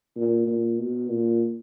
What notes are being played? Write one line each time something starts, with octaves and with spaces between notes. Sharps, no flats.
A#2
A#2
B2
A#2